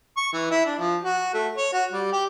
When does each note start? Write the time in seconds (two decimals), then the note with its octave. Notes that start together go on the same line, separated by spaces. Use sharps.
0.17 C#6
0.33 E3
0.51 E4
0.66 D4
0.79 F3
1.04 F#4
1.34 A3
1.57 C#5
1.73 F#4
1.92 G3
2.12 G4